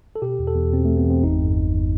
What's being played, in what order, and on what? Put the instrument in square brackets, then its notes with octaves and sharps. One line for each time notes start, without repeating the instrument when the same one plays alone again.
[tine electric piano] A4
B2 G4
E2
A4
E2
B2 C4
E2 A3
B3
E2 C4
G1 D#4
G2
G1
G1